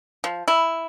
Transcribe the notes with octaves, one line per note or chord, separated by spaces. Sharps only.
F3
E4